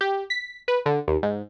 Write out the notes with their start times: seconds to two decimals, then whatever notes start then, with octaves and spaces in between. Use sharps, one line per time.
0.01 G4
0.30 B6
0.68 B4
0.86 D3
1.08 D#2
1.23 G#2